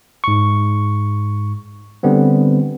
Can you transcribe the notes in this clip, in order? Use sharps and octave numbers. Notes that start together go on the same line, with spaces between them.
G#2 C#6
D3 G3 B3 C4